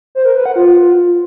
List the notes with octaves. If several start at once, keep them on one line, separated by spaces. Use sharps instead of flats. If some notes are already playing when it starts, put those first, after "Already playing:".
C5
A#4
B4
F#5
F4